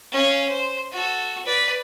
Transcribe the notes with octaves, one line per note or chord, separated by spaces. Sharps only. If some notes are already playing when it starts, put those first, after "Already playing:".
C#4 F5
C5
F#4 A4
B4 D5